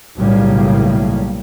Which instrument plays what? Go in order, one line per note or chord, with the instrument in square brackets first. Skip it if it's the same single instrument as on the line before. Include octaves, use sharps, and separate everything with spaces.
[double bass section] B1 A2 C#3 G3 A#3